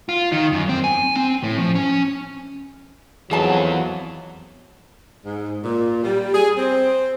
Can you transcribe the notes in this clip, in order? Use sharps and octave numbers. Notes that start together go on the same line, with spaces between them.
F4
D#3
F#2
C4
G#5
C4
A2
F3
C#4
F2 E3 F#3 B3 G#4 A5
G#2
A#2
G3
G#4
C4